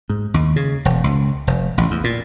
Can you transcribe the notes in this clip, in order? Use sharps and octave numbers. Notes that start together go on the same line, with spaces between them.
G#2
D#2
C#3
E1
C#2
F1
A1
E2
A#2